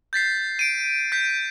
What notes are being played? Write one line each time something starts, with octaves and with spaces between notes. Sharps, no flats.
G6 A6 B6 C7
D7 D#7
G6 B6